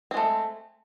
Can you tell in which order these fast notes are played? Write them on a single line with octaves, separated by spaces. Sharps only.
C4 G#3 A3